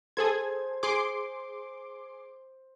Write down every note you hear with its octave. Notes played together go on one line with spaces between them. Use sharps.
G#4 A4 C5 G#6
G#4 C6 D6